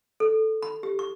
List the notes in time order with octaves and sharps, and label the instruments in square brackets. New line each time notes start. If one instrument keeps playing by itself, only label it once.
[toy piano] A4
B5
G4
C#6